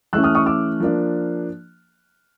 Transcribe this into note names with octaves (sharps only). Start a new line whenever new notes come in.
E3 A3 C#4 E6 F#6
D#6 F6
C#6 D#6
D6 E6
F3 A#3 D4